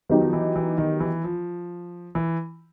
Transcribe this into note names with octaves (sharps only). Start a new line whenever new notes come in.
D#3 F#3 B3 D#4 G4
F3
E3
E3
D#3
E3
F3
E3